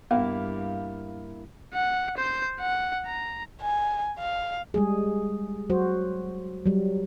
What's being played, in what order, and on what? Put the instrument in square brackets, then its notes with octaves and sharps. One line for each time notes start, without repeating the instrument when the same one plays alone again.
[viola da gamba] G2 [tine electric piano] A#3 E4 [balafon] B3 [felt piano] F5
[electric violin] F#5
C5 G6
F#5
A#5
[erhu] G#5
F5
[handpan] G3 G#3 G#4
F#3 F#4 C5
F#3 G3